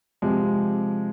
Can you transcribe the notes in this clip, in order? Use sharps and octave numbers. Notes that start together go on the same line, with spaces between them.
C3 F3 G#3